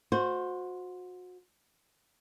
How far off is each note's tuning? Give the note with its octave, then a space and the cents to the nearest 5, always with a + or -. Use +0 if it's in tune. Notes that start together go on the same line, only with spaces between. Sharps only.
F#4 -30 C5 +0